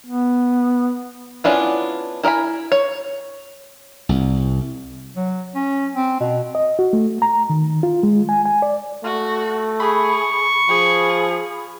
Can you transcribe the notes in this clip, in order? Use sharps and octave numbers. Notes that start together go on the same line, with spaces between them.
B3
B3 C#4 D4 E4 F4
E4 A#4 D#5 G#5 B5
C#5
C2
F#3
C#4
C4
B2
D#5
F#4
A3
A#5
D#3
F4
G#3
G#5
G#5
D5
A3 F#4
G#4 B5 C#6
F3 G#4